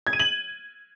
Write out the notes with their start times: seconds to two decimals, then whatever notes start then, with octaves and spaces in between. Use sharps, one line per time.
0.07 G#6
0.13 D#7
0.20 F#7